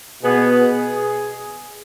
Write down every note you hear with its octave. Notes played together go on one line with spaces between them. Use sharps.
B2 B3 G#4
G#4